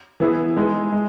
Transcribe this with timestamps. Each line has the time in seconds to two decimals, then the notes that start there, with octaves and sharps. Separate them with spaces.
0.20 E3 B3 E4 G#4
0.57 G#3 D#4 G#4
0.92 G#3